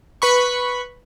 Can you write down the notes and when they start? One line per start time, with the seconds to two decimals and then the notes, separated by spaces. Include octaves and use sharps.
0.22 B4 B5 C#6